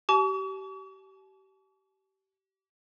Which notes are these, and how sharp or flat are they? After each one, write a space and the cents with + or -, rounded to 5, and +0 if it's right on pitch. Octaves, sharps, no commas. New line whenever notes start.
G4 -30 A5 -45 C#6 +45